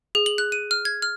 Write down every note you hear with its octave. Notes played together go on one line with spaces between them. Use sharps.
G#4
F#7
F#6
D#7
F6
G#6
F6